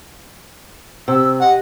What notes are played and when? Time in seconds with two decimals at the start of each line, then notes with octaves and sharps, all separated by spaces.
1.08 C3 E6
1.41 D#5 F#5